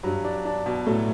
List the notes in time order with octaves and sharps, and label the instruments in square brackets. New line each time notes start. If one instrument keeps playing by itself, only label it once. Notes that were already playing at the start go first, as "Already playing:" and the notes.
[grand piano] G2 G3 [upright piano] F#3
[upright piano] D4
D4
B2
[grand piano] A2 A3 [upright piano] F#3